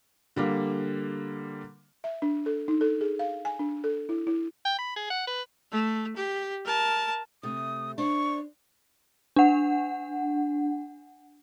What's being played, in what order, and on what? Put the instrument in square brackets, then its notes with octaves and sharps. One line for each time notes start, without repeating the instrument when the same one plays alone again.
[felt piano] D3 G3 A#3
[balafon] E5
D4
A4
D#4
A4
G#4
F5
G#5
D4
A4
E4
E4
[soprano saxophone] G5
B5
G#4
F#5
B4
[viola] A3
G4
A#4 A5
[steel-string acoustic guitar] C3 A3 [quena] D#6
[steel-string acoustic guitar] D4 C5 [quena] C#6
[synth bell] D4 F#5